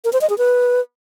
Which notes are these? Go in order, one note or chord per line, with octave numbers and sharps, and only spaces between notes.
A#4
C5
D#5
G#4
B4